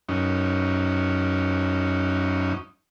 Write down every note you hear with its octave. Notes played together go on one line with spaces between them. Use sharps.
F#2 C#4 D#4